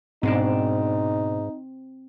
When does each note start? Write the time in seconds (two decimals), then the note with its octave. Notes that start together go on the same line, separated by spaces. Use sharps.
0.23 G#2 B2 G#3 C4 D4 D#4